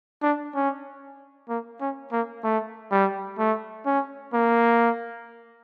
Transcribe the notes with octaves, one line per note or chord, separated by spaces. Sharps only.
D4
C#4
A#3
C#4
A#3
A3
G3
A3
C#4
A#3